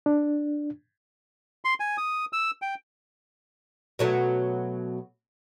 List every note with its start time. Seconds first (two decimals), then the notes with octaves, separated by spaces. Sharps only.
0.06 D4
1.65 C6
1.80 G#5
1.98 D#6
2.33 E6
2.62 G5
3.99 B2 F#3 A3